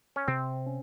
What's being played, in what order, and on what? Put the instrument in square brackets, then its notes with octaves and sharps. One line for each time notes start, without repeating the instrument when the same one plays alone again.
[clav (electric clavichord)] C#4
[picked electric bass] C3 [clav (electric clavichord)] C4
[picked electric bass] C#4